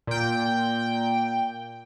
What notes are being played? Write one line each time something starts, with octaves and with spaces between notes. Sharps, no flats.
A#2 G5